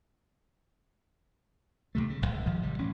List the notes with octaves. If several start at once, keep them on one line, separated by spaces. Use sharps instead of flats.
D#2 G#2 C3 A3
C#3
D1 G#1
G#1 D#3 F3 G3
C3 G3
A1 C#4